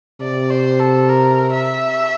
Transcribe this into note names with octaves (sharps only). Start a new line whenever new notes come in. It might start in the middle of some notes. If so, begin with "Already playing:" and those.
C3 D5
C5
A4
A#4
E5